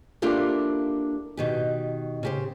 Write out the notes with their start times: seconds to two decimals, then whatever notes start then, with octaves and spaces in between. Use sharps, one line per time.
0.22 A#3 D4 E4 F4 G4 A4
1.37 B2 D#3 G4
2.23 C#3 G4 C5